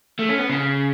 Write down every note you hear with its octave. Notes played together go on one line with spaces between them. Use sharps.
A3
C#4
B3
C#3